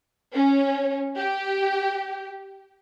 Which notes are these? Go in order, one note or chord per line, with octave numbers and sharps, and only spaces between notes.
C#4
G4